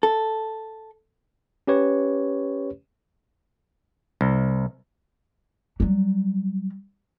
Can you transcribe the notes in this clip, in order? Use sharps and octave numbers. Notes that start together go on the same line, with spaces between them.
A4
C#4 G4 B4 C#5
C2
F#3 G3